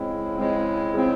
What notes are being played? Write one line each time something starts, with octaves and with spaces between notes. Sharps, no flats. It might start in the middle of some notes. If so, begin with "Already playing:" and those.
Already playing: C#3 F3 G#3 C4 E4
C#3 F3 G#3 C4 E4
C#3 F3 G#3 C4 E4